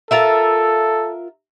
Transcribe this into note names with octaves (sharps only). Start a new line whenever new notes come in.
F4 A4 A#4 E5